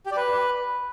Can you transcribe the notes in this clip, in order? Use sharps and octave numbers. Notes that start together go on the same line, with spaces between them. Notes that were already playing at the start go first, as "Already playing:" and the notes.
G4
D5
B4